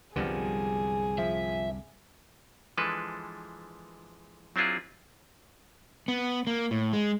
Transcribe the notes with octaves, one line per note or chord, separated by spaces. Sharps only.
C2 F#2 D3 F3 G3 B3 G#4
F3 E5
E3 F3 G#3 D4 A4 B4
F#3 C4 D4 E4 F4 G#4
B3
A#3
A2
G#3